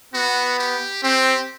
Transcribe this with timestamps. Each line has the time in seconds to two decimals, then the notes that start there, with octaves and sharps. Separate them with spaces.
0.14 B3 F#4
0.59 G4
1.03 C4 G4